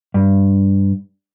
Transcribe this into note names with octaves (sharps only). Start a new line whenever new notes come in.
G2